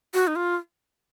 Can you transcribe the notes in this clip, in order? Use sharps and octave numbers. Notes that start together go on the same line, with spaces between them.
F#4
D#4
F4